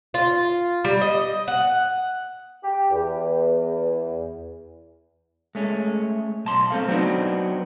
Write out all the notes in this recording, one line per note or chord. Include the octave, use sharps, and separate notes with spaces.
F4
G3
D#5
F#5
G4
E2
G#3 A3 C#4
B1 A5 C6
A3 C4 A4 F5
F#3 B3 C4 D4 D#4 F#4